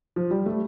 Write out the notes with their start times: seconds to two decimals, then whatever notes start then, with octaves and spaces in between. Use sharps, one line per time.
0.16 F3
0.31 G3
0.46 A3